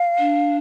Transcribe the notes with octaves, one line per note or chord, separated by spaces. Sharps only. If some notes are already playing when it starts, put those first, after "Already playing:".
Already playing: F5
D4